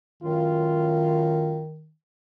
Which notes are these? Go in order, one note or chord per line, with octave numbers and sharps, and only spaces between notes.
F#2 A2 D#3 F4